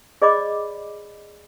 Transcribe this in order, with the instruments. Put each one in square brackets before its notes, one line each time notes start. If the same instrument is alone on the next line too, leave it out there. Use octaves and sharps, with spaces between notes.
[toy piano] G#4 C5 D5 D#5 B5 D6